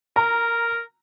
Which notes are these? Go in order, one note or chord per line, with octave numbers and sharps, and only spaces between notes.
A#4 A#5